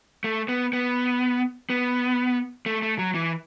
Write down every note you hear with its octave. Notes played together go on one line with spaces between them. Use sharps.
A3
B3
B3
B3
A3
A3
F#3
E3